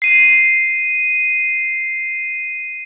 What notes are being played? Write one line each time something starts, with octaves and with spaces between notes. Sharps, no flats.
C7 D#7